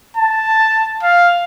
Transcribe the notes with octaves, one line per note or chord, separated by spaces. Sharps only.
A5
F5